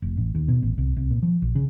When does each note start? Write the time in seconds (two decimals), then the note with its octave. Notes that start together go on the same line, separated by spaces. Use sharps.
0.02 F1
0.17 A1
0.35 D#2
0.48 B2
0.62 A1
0.78 C2
0.97 C2
1.10 A#2
1.23 F3
1.42 A#1
1.55 C#3